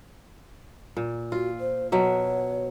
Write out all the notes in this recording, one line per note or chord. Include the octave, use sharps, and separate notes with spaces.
A#2
F4 F#4
C5
B2 F#3 C#5 E5